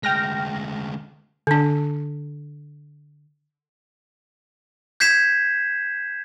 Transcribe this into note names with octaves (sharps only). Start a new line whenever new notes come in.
D2 G#3 G5 F6 A#6
D3 D4
G6 G#6 B6 C7 E7